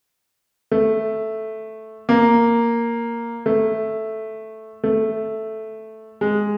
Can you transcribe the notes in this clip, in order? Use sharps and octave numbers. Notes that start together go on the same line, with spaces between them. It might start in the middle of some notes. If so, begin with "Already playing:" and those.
A3
A#3
A3
A3
G#3